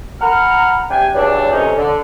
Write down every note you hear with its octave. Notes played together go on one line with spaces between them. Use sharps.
F#5 A#5 B5 F6
C3 D4 G4 G5 G#5
C#3 E3 F#3 G3 D4
F2 C3 C#4 D#4
D3